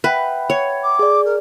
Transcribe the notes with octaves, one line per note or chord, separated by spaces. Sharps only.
B4 E5 F#5 G5
C#5
D6
G#4 D5
A#4